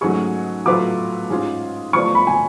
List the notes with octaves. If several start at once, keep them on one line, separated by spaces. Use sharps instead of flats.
G#2 F#3 A3 C#4 G#4 C#6
A2 F#3 A3 F4 B4 D6
G#2 G#3 C#4 F4
F3 A3 F4 B4 D5 C#6
B5
G#5